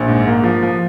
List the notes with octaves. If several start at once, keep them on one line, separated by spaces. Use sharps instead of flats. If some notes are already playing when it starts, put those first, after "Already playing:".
Already playing: A#1
G#2
A#3
F3
F3